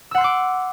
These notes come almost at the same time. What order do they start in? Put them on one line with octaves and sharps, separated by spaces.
E6 F#5 C6 F#6 D6